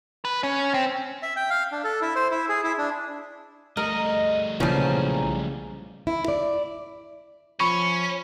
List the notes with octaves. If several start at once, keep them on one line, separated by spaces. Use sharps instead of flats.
B4
C#4
C4
E5
G5
F5
D4
A4
E4
C5
E4
G#4
E4
D4
G3 A3 A#4 D#5
B1 A#2 C#3 E3 F3 G#5 A#5
E4
D5
F3 C#4 B5 C#6